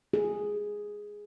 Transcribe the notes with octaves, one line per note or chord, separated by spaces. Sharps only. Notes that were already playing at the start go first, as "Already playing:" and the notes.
G#4